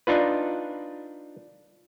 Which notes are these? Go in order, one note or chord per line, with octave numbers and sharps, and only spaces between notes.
D4 D#4 F4 B4